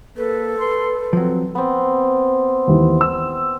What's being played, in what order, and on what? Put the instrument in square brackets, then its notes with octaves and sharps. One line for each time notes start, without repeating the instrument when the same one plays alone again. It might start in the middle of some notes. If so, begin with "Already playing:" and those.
[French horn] A#3 [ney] A4 [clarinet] B4
[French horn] B4 [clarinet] C6
[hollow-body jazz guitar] F3 F#3 [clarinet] C4
[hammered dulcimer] B3 C4
[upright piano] D#2 E3
E6